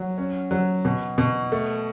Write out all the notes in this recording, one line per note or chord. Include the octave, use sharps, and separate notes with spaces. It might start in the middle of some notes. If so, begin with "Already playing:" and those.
Already playing: F#3
C#4
F#3
B2
B2
A3